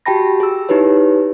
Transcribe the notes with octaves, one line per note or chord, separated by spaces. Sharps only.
F#4 G4 G5 A5 B5 A#6
G#4 E6
D#4 E4 G4 B4 C#5